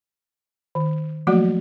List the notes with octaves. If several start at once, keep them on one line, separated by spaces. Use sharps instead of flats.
D#3
F3 F#3 A3 A#3 F#4